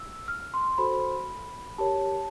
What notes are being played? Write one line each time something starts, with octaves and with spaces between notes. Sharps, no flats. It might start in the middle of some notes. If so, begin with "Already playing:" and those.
Already playing: E6
F6
C6
F#4 A4 C5 B5
G4 A#4 C#5 A5